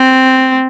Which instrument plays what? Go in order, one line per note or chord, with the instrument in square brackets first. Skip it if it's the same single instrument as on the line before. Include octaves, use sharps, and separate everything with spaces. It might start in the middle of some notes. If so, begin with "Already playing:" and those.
Already playing: [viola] C4